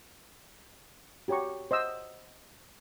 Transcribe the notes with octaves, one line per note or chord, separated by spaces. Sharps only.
F#4 G4 C#5 A#5 C#6
C5 D#5 F#5 E6